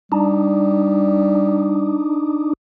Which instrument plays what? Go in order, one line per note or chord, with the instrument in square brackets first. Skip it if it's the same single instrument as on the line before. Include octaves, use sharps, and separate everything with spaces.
[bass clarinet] G3 [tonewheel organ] D4 D#4